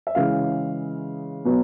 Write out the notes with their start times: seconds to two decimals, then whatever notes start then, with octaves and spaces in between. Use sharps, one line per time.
0.07 E5
0.15 C#3 E3 G#3 F5
1.45 B2 F#3 B3